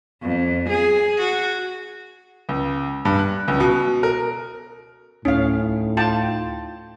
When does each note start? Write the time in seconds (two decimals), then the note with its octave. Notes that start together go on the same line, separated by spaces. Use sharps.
0.23 F2
0.69 G#4
1.18 F#4
2.49 C#2
3.05 G2
3.19 F#6
3.48 C#2
3.60 B2
4.03 A#4
5.25 D2 A2 C#4 D#4 F5
5.97 F4 G5 A5